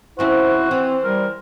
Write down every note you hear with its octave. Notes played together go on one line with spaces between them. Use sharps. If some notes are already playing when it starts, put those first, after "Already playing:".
D#2 C4 C#4 E4 F#4 C5
E3 C4
G3 A#4